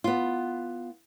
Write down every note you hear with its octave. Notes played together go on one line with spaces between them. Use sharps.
B3 F4